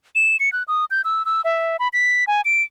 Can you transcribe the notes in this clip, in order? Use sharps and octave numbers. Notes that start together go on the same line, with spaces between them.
E7
C#7
F#6
D#6
G6
E6
E6
E5
B5
B6
G#5
D7